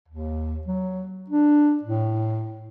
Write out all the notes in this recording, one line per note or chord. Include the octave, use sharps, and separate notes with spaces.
D#2
F#3
D4
A2